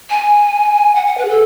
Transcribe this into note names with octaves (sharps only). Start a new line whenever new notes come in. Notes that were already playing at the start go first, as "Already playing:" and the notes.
G#5
F#5
F#5
B4
G#4
A4